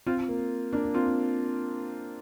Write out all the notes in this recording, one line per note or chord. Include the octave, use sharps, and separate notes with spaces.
C4 F4
A#3
A#3 D4
C4 F4